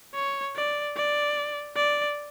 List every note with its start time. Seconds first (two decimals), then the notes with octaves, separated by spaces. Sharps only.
0.15 C#5
0.56 D5
0.96 D5
1.76 D5